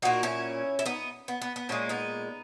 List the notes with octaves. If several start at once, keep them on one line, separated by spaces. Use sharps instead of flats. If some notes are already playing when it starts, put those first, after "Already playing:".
A#2 A#3 D#4 F#4
C#4 E4
E4
B3 D#4
B3
B3
B3
A#2 G#3 A#3 C#4
B3 D#4